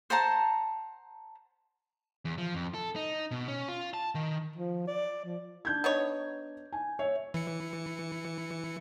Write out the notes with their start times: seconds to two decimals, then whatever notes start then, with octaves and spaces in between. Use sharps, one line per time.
0.10 C5 F#5 A5 A#5
2.25 E2
2.38 F3
2.55 F2
2.74 A4
2.96 D#4
3.31 B2
3.48 C#4
3.69 F4
3.94 A5
4.15 D#3
4.56 F3
4.87 D5
5.25 F3
5.65 D4 G6 G#6
5.84 B3 D#4 C#5
6.72 G#5
6.99 C#5 E5
7.34 E3 C#7